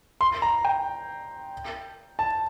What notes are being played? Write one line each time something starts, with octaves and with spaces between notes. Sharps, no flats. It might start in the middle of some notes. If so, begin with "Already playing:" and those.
C6
A#5
G5
A5